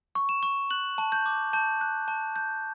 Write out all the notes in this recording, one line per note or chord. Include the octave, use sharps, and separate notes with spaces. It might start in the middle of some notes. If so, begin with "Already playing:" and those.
C#6
E7
C#6
F#6 F#7
A5
G6
D6
A5 G6
F#6
A5
G6